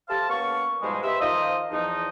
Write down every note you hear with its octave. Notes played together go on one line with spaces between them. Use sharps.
G4 A4 C5 F5 A5
A#3 B3 C#4 F5 C#6
G#2 B2 F3 G3 G#3
G4 B4 C5 D#5 E5
D#3 F3 D#4 F4 C5 D#5
E2 F3 D#4